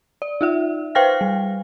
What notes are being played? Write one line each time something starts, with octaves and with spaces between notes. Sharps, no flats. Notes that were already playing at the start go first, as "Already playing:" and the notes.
D5
D#4 F4 E5
B4 C5 F5 G5 F6 A#6
G3